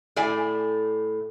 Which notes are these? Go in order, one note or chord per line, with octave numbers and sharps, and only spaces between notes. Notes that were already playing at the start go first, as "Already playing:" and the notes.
A2 A3 D5 G#5